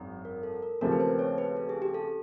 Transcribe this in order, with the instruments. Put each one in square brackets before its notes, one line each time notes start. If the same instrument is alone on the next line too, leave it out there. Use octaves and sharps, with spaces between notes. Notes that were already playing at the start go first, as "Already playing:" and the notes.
Already playing: [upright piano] G#1 F#2
[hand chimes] A#4
A4
A#4
[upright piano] D#2 C#3 F3 A3 C4 [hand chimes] A#4
[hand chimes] B4
C5
C#5
B4
A4
G#4
G4
A4